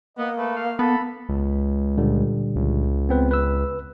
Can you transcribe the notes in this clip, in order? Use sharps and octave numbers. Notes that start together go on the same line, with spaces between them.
A#3 B3 D#5
A3 B4
F5
B3 A4 B5
C#2
A#2 D3 G3
C#2
B3 C4 B4
B4 E6